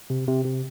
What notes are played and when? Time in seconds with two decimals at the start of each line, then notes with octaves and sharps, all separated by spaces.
0.10 C3
0.27 C3
0.44 C3